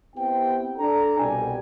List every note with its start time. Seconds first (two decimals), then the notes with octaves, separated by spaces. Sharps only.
0.16 B3 C4 E4 G4 G5
0.78 D4 A4 A#5
1.18 C2 B2 G3 G5 G#5